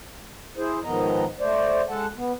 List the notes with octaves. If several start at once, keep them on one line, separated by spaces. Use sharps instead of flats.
E4 G#4 C5
G#2 D#3 F3 B3 D#5 A#5
A3 C5 D5
G#3 A4 F#5 A5
B3